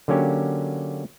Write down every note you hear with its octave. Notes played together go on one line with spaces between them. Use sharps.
D3 F#3 A#3 C#4 G4